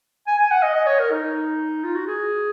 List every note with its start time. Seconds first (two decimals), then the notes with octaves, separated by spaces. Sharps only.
0.27 G#5
0.39 G#5
0.52 F#5
0.62 D#5
0.75 D#5
0.86 C#5
0.99 A#4
1.11 D#4
1.84 F4
1.95 F#4
2.07 G#4